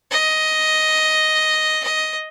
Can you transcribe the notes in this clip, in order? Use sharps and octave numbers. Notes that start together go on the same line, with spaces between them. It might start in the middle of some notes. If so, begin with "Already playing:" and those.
D#5
D#5